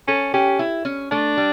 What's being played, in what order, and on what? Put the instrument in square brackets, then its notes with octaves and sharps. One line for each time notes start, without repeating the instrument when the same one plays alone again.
[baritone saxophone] C#4 [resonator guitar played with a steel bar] A4
[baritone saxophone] C#4 [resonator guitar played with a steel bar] G4
[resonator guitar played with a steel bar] E4
C#4
[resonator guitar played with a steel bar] A3 [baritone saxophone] D4
[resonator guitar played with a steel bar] G3